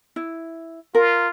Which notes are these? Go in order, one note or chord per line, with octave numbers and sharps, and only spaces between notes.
E4
F4 A#4